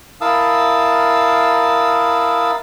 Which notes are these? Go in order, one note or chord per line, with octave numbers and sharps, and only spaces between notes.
E4 A#4 F5 A5 D#6 E6